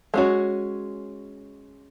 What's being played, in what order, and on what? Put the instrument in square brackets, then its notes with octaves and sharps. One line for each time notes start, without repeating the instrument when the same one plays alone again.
[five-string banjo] G#3 C#4 F#4 C#5